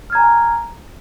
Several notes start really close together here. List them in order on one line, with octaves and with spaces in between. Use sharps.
F6 G#6 A#5 G#5